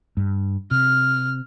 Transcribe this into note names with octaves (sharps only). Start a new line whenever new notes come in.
G2
C3 F6